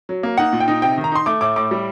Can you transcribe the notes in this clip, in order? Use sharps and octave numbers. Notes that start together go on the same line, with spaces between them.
F#3
A#3
D#4 F#5
A#2
G5
D#4
C3 G5
D#3
A#5
D#4 C6
A3 D6
A2 D6
A2 D6
G3